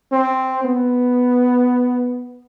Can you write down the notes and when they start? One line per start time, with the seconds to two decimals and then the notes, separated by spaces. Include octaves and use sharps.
0.12 C4
0.65 B3